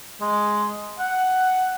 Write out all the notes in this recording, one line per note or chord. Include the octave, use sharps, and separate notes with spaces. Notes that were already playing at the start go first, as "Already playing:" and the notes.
G#3
F#5